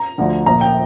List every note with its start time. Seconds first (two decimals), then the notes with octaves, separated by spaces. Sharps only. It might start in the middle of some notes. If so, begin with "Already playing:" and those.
Already playing: A#5
0.18 D2 D3 F3
0.46 A#1 A#2 F3 A#5
0.61 G5